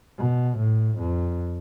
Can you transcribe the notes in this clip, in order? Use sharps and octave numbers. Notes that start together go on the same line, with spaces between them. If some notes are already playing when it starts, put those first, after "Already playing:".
B2
A2
F2